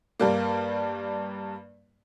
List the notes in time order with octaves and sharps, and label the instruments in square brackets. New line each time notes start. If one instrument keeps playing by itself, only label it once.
[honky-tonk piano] G2 G3 A#3